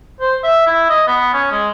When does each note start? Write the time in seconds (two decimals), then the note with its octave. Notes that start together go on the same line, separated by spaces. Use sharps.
0.20 C5
0.43 E5
0.67 E4
0.90 D#5
1.07 B3
1.33 C#4
1.52 G#3